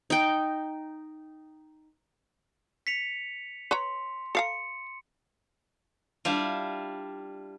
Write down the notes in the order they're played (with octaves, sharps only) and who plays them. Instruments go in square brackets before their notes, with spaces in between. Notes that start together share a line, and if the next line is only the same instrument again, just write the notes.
[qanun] D#4 G5
[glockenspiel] B6 C#7 F7
[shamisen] B4 C#5 A#5 [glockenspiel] C6
[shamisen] A4 F5 A#5 [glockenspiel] C#7
[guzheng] G3 D4 E4 F4